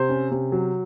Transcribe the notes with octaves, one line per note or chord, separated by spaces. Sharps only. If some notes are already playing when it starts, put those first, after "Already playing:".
Already playing: C3 C5
C#4
C3
F#3